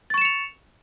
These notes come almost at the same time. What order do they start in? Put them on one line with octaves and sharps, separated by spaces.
A6 C#6 E7 C#7 F7